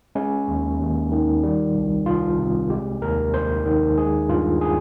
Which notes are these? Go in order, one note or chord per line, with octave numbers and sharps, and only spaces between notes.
G#3 C#4
D#2
D#2
D#3
G3
C2
C2 F4
C3
G#3 G4
D#2 A#4
D#2 C5
D#3
G#3 G#4
G2 F4
G#4